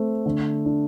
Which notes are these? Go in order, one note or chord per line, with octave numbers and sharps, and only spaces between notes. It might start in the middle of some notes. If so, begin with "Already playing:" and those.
Already playing: A3 C4
D3
D4